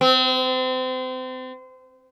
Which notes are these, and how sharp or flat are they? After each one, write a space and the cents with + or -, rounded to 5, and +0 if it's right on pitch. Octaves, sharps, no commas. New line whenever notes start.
C4 -30